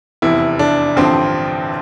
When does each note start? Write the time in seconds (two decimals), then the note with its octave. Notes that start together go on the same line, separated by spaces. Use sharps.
0.22 F1 E2 C3 E4
0.59 D4
0.96 A1 G2 D3 F3 C4